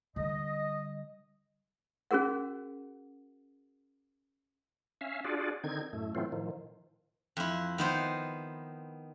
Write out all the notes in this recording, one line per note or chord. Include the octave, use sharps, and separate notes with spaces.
D3 G3 D#5
C#4 F#4 G#4 A#4 F#5
C#4 E5 F5
D4 F4 F#4 G#4 D5
D3 D#3 C4 D#4 G#6
F#2 A2 A3
A2 E3 F#3 A3 C4 F4
A2 D#3 F3
F2 E4
D#3 B3 C5